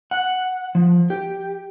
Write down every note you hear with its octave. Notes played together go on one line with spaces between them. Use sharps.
F#5
F3
G4